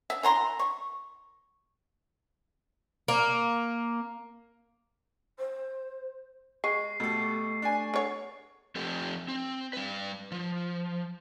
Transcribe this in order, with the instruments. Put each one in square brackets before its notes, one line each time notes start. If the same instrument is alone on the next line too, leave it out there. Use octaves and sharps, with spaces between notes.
[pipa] E5
E3 A#5 C6
C#6
[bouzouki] A#3
[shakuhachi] C5
[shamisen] G#3 [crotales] C#6 C7
[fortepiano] B2 A4 [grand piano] A3 G4
[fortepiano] D4 G#5
[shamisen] D3 C#5
[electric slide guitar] F3 A3 C4 G4 A4
C4
G3 B4
F3